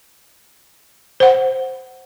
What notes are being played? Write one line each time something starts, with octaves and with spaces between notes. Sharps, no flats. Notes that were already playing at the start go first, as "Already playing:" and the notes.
C5 F#5